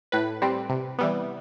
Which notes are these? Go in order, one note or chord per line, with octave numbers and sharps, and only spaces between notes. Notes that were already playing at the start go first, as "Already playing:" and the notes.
A2 B4
G3 C4
C3
E3 G3 B3